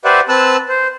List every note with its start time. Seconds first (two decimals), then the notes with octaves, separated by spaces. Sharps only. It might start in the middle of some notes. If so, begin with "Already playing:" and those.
0.05 G4 B4 C5 D5 E5 F#5
0.29 C4 B4 A5 E6 F#6
0.69 C5